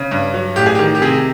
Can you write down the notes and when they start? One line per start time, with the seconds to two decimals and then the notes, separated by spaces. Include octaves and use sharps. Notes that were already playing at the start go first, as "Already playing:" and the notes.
Already playing: C#3
0.11 G2
0.34 F#3
0.56 A1 G4
0.66 G#4
0.75 G4
0.79 D#3
0.95 G4
1.02 C3 G#4